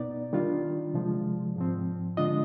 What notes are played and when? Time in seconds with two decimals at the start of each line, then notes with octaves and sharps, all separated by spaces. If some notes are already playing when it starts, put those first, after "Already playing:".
Already playing: B2 B3 D#4 D5
0.33 D#3 G3 D4 F4
0.94 C3 F3 G#3
1.56 G#2 F3 C4
2.17 D3 G#3 D4 F4 D#5